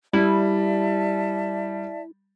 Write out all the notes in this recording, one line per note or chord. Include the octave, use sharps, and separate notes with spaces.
G3 E4 D5 E5 A5